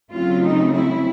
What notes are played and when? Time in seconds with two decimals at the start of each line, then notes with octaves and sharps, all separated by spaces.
0.11 C#3 F#3 A3 C4 F4
0.42 D#4
0.74 E4